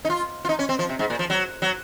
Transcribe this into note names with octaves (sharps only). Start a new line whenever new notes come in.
D#4
F4
F4
D#4
C#4
C4
F3
C3
G#2
A#2
F3
F#3
F#3